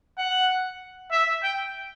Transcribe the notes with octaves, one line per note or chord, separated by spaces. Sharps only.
F#5
E5
G5